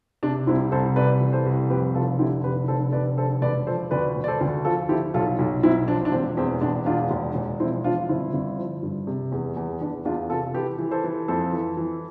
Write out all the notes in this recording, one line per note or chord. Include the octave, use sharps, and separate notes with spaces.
C3 D4
C2 C4 E4
C2 A4 C5
C3 B4 D5
E3
A4 C5
C2
F2 G4 B4
F1 F4 A4
D3 E4 G4
F1 G4 B4
F1 A4 C5
F1 B4 D5
D3 A4 C5
E1 B4 D5
F3 A4 C5
D2 B4 D5
E1
D5
A4 C5
D2
F3 F4 A4
F3 E4 G4
B1 F4 A4
B1
B1 C4 E4
F3 D4
D4
E1 C4
E2 C4
E1 D4
E2 D4 F4
E1
E1
F3 C4 E4
F3 D4 F4
G1 C4 E4
G1
F3
G2
C3
E2
E2
E2 D4
E2 D4 F4
C3 F4 A4
E3 G4 B4
E3
A4 C5
E3
F2 A4 C5
E3
E3